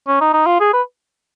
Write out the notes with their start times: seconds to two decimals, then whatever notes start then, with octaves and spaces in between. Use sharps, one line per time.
0.07 C#4
0.21 D#4
0.34 D#4
0.46 F4
0.60 G#4
0.73 B4